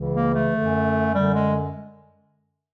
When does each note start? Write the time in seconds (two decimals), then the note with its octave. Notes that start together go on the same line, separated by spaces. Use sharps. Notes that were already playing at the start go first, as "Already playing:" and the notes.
Already playing: C#2 C#3 E3
0.12 A#3
0.33 A3
0.54 F#2 D3
1.13 F#2 D3 G3
1.33 G#3